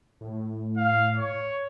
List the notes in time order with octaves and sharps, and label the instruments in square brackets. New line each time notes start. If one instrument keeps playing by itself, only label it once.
[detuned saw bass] A2
[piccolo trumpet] F5
C#5